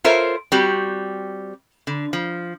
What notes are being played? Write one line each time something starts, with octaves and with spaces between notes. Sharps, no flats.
F4 A4 A#4 C5 C#5 E5
G3 C4 F#4 G4
D3
F3